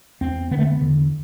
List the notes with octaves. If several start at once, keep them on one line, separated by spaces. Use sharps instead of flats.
E2 C4
D3 B3
A3
B3
E2 D3